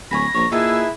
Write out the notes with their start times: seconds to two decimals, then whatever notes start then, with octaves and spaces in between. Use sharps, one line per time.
0.11 D1 C#5 G#5 B5 A#6
0.34 A#1 C#5 A#5
0.52 A#2 D#4 E4 G#4 B4 A5 E6